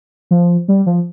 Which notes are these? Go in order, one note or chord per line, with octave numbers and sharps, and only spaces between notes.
F3
G3
F3